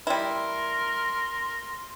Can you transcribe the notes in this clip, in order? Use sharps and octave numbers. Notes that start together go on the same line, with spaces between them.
G3 E4 A#4 C6